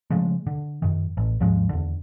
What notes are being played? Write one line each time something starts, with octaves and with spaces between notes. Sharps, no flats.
C#3 F3 G#3 A3
D3
F#2 D#3
A1
D#2 G#2 F3 G#3
E2 D3